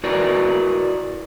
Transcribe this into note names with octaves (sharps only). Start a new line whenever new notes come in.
E4 F#4 A#4 B4 D5